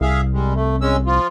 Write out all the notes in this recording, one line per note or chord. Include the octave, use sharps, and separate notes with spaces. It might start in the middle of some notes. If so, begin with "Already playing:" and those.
C2 G#4 E5 F5
G3 G#3
A3
G#3 C#4 E6
F3 F4